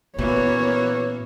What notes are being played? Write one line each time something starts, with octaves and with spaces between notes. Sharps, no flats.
A#2 E3 A#3 B3 C#4 F#4 B4 C#5